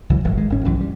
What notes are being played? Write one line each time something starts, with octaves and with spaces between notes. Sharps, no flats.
C#2 E3 F#3
D1 G1 E3 F#3
D#3 G#3
G#1 D#3 C#4
B1 F#2 E3 F#3
G3